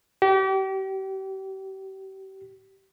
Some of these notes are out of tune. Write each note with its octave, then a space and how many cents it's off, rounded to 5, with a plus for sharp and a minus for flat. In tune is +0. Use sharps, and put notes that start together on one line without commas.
G4 -35